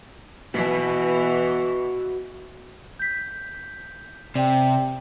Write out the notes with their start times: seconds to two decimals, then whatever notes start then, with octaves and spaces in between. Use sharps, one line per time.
0.54 B2 E3 F#4 B4
2.99 G6 B6
4.35 C3 D5 G5